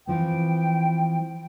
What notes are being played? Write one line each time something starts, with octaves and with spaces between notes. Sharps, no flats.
E3 F3 C4 G5